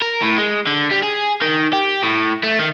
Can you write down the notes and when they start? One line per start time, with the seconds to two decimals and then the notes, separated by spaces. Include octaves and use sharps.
0.02 A#4
0.22 A2
0.38 G#3
0.67 D3
0.91 G3
1.03 G#4
1.42 D#3
1.73 G4
2.03 A2
2.43 A3
2.59 D#3